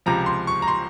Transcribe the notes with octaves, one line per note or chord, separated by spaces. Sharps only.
C#2 C3 F3 A#5
C6
C#6
A#5
C6